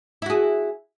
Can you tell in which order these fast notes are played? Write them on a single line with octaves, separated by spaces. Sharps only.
E4 F#4 G#4